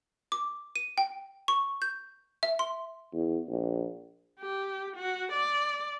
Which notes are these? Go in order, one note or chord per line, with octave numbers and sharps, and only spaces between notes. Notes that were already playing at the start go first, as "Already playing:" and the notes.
D6
D#7
G5
C#6
G6
E5
C6
E2
A#1
G4
F#4
D5